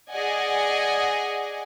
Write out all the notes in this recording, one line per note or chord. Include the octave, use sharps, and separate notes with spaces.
G#4 D5 D#5 F#5 G#5